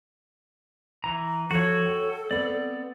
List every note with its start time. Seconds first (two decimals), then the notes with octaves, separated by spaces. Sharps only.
1.04 E3 A#5
1.51 F3 F#4 A4 C#5
1.86 G5
2.31 B3 C4 D5